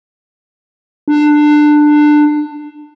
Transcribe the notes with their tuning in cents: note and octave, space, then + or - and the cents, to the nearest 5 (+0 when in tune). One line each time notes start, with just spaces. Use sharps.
D4 +20